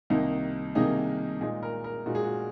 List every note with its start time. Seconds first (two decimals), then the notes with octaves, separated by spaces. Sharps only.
0.10 C2 C3 D#3 A#3 D#4
0.75 C2 C3 D#3 A#3 D#4 G#4
1.41 A#2 G#3 D#4 G#4
1.63 A#4
1.84 A#4
2.06 A#2 G#3 D#4 F#4
2.15 G#4
2.24 F#4